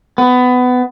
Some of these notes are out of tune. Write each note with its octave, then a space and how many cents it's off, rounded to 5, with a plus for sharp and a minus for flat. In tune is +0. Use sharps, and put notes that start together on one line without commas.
B3 +20